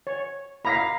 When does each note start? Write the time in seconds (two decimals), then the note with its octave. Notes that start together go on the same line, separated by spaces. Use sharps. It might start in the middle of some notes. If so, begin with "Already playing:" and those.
0.07 C#5
0.65 F5 A#5 B5 A#6 B6